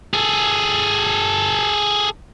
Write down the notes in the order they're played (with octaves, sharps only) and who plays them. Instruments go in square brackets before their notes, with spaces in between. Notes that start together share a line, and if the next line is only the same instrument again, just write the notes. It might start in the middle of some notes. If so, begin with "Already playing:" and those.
[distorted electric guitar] G#4 A4